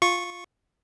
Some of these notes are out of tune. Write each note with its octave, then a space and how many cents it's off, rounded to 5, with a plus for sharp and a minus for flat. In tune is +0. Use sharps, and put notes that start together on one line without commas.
F4 +5 C#6 -10